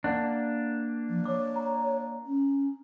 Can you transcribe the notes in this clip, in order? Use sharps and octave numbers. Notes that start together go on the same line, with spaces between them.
A#3 D4 F#5
F3
C#5 D6
A#5
C#4